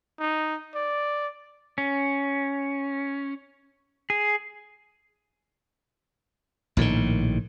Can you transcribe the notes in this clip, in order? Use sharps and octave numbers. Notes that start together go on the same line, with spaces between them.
D#4
D5
C#4
G#4
A#1 A2 C3 D#3